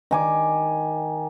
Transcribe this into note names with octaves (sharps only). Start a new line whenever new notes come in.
D#3 G#5 D6